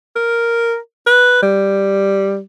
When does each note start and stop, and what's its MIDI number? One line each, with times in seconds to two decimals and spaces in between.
0.16 0.77 70
1.07 1.42 71
1.42 2.41 55